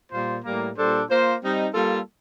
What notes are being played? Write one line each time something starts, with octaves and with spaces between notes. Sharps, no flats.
A#2 G3 A#3 F4 C5
A2 G3 A#3
A#2 G3 D4 A4 C5
A#3 F4 C5
G3 C4 D#4
G3 A#3 F4 A4